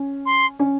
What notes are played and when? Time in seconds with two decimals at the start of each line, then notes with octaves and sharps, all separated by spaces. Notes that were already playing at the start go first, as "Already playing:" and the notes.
Already playing: C#4
0.26 C6
0.59 C#4